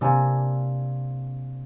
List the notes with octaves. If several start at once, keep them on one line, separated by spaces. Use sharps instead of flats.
C3 A#3 D4 G#5